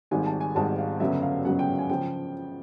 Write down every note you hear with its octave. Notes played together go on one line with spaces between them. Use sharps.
G#1 G#2 D#3 G3 G#5
A5
G#5
G#1 G#2 D#3 G3 A5
F5
G1 F#2 C#3 F#3 E5
F5
G1 F#2 C#3 F#3 F#5
G5
G#5
C#3 F3 G5